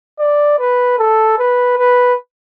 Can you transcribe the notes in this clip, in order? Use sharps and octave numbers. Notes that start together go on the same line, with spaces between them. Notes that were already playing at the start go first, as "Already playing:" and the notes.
D5
B4
A4
B4
B4